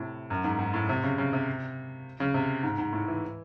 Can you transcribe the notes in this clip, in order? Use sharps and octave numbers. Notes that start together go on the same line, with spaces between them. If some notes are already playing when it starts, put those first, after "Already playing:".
Already playing: A2 C3
F#2
G#2
G#2
A2
C3
C#3
C#3
C3
C#3
C3
G#2
G#2
A2
E3